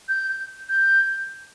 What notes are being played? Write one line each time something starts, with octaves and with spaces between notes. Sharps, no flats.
G6
G6